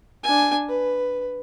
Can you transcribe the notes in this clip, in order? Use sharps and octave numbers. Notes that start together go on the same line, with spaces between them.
D4 G#5
B4